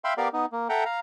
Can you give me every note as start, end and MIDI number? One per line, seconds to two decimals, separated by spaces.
0.04 0.14 76
0.04 0.14 77
0.04 0.14 79
0.04 0.14 83
0.04 0.14 84
0.18 0.29 59
0.18 0.29 67
0.18 0.29 70
0.18 0.29 74
0.18 0.29 77
0.33 0.46 59
0.33 0.46 63
0.52 0.68 58
0.69 0.84 69
0.69 0.84 76
0.69 0.84 78
0.69 0.84 79
0.69 0.84 82
0.86 1.00 77
0.86 1.00 82